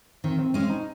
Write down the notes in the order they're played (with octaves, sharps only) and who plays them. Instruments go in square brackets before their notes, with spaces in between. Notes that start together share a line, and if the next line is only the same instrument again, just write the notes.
[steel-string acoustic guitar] D#3 [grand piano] C4
[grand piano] C4
[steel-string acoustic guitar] G#3 C#4 [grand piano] C4
[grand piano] D#4